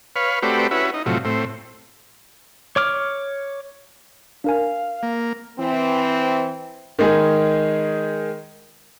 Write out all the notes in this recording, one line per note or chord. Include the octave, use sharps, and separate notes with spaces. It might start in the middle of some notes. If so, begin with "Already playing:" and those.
B4 C#5 F5
A3 C4 F#4 G4 B4 D5
C#4 E4 F#4 B4
D#4
A2 C3 F3 F#3
A2 C4
C#5 D6 F6
D4 A#4 F5 G#5
A#3
E3 C4
D#3 G#3 G#4